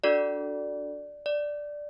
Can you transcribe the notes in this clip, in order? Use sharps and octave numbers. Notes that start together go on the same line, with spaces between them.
D4 F#4 A4 D5
D5